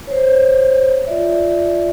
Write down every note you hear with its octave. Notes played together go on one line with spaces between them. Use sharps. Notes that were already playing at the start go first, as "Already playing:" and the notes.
C5 C#5
F4 D5 E5